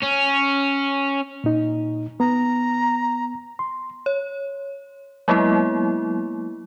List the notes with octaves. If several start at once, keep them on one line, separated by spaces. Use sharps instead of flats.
C#4
A#2 D#4
B3 A#5
C6
C#5
F#3 G#3 A#3 B3 E4